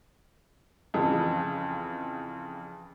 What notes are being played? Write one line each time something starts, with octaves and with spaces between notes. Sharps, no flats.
F2 C#3 E3